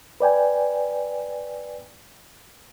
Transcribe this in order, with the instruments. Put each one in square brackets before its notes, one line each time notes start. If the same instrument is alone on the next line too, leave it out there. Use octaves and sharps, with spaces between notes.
[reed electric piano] B4 D5 G5 G#5